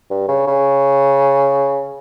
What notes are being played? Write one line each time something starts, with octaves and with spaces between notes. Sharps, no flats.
G2
C#3
C#3